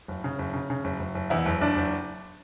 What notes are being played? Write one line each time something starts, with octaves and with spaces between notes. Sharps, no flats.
F#1
C#3
F#1
C#3
C#3
F#1
F#1
F#1
E2 E4
F#1
F#1 D4
F#1